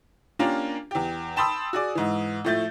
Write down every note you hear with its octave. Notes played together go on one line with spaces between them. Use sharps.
A#3 C#4 D4 F4 G4 A#4
E2 G4
G5 A5 B5 C6 D#6 E6
F#4 G#4 D5
G#2 E3
A2 F3 A3 G6 A6